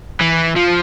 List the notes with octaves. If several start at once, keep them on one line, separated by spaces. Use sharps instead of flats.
E3
F3